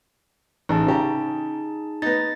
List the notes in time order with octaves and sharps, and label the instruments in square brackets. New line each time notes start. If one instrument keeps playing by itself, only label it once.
[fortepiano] A1 [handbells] D#4 G#4 A5
[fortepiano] C#3 G4 A#5
[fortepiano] B3 D#4 [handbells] A6 A#6